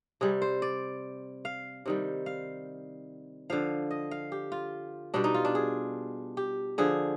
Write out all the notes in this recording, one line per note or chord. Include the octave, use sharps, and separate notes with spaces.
C3 G3 G#4
C5
D5
F5
C3 D#3 G3
F5
D3 F3 F5
D#5
F5
G4
F4
B2 G3 D4
D#4
F4
D4
G#4
G4
D3 F3 G#4